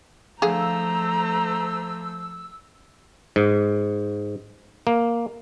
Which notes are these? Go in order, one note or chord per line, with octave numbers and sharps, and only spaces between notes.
D3 F3 A3 G#4 C5 F5 A#5 E6
G#2
A#3